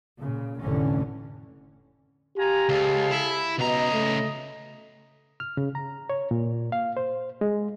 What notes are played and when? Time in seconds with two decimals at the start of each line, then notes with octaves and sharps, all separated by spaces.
0.20 A#2 C#3
0.61 F1 A2 D3 E3 C#4
2.37 F4 G4 G#5 A#5
2.69 C#2 G#4 A4 F5
3.11 E4
3.59 C#2 B2 D#5 A#5
3.93 A3
5.40 F6
5.57 C#3
5.75 A#5
6.10 C#5
6.31 A#2
6.72 F5
6.97 C5
7.41 G#3